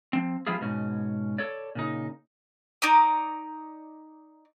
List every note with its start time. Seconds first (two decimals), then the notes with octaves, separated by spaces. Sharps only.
0.13 F3 C4
0.47 F3 G3 B3 E4 F4 G#4
0.61 G#2 B2 C#4
1.38 A4 C#5 D5
1.75 A#2 C#3 D#4
2.82 D#4 D5 A#5 D#6